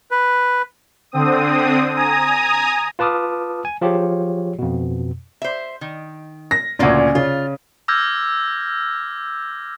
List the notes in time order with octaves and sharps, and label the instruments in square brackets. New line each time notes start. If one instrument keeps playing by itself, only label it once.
[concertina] B4
[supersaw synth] D3 C4 D#6
G#5 A#5 D#6
[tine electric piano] F4 B4 A5 D6 D#6 F6
G#5
F3 F4 G4 G#4 C#5
F2 B2
[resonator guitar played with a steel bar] C5 E5
D#3
[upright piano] A#6
[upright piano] D2 A#2 [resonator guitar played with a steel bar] C#3 C#4 D5
[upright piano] C#3 [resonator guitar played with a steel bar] F4
[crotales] D6 E6 F6 G6 G#6 A#6